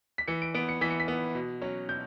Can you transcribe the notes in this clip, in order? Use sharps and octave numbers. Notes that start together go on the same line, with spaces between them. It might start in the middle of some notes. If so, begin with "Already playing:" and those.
B6
E3 C#7
D7
B3 D7
C#7
E3 B6
C#7
B6
B3
B2
F#3 C#4
B2 G6